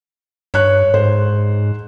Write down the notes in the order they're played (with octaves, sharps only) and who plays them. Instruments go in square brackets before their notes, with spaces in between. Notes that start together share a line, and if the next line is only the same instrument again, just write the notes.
[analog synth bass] G2 [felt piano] C#5 F#6
[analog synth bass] G#2 [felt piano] C5